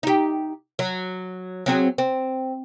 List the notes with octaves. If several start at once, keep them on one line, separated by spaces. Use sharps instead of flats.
D#4 G4
F#3
F#3 C4 G#4
C4